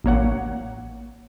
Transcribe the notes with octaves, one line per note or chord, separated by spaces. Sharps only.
A1 A#3 C#5 F#5